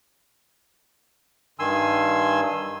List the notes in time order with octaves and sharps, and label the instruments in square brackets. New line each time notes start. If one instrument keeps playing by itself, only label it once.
[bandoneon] G2 D#3 G#5 C6 E6